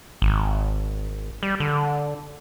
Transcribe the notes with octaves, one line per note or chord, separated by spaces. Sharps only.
G#1
G3
D3